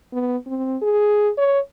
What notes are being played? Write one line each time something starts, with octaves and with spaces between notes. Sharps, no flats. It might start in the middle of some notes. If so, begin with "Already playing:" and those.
B3
C4
G#4
C#5